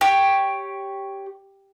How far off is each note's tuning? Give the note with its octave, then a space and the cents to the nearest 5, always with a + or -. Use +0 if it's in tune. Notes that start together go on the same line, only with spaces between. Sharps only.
G4 +0 C#5 +0